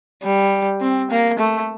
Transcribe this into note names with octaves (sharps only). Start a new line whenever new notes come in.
G3
C4
A#3
A3